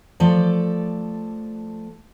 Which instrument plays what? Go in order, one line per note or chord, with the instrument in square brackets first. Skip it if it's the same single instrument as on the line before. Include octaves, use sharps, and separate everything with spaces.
[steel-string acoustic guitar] F3 A3 A4 D5